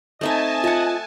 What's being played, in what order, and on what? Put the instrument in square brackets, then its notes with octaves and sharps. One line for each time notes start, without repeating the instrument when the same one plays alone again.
[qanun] A3 D#4 E5 [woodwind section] C4 D#5 [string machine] G#5 A5
[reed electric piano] F4 [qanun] E5 F#5